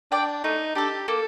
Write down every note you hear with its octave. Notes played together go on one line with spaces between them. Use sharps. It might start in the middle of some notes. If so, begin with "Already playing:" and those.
D4 D5 G5
A3 D#4
D4 G4 A4
A#3 A4